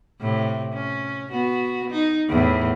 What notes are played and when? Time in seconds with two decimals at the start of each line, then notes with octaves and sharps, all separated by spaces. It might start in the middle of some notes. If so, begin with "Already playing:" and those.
0.21 A2 C3
0.74 C#4
1.32 B3 F#4
1.91 D#4
2.29 E2 A2